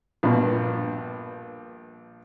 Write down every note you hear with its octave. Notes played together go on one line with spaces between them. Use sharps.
A#1 G2 B2